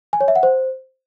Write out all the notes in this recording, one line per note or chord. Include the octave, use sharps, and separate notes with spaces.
G#5
C#5
E5
F#5
C5